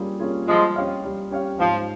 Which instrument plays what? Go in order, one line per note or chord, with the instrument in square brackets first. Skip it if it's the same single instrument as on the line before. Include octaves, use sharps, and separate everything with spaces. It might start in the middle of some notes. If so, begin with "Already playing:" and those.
Already playing: [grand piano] G3 A#3 C#4 F4 G#4
A#3 C#4 F4 G#4
[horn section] F3 G#3 [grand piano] G3
[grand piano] C#4 G4 C#5 F5
G3
C#4 G4 C#5 F5
[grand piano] G#2 [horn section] F3